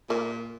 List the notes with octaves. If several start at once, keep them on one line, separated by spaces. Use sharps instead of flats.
A#2 A#3